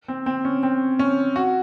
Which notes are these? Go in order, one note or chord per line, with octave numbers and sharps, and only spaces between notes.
C4
C4
C#4
C4
C#4
F#4